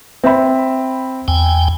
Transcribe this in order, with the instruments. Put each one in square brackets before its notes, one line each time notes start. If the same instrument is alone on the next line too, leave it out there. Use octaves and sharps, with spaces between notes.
[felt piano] C4 E5 B5
[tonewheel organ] E2 G5 G#5